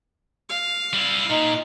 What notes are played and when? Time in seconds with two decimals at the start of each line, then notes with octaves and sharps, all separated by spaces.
0.49 F5
0.93 G3 E4
1.30 A#2 D#4